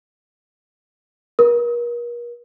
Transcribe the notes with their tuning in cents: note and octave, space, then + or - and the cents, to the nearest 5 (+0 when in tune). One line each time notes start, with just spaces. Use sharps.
A#4 +40